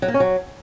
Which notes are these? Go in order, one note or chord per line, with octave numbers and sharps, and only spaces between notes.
F#3
A#3
C#4
F#3